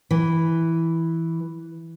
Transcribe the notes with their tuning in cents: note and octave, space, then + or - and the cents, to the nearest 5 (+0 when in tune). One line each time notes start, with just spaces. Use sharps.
E3 -5